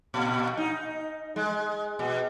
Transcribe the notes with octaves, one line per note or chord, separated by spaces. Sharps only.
A#2
D#4
G#3
B2